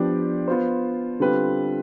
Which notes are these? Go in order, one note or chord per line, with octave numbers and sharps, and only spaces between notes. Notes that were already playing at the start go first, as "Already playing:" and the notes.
Already playing: F3 B3 D4 G4 D5
B3 F4 C5
D3 G3 C4 F4 B4